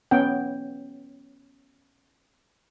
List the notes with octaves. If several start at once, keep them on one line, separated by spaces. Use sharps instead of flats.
B3 C#4 F#5 G5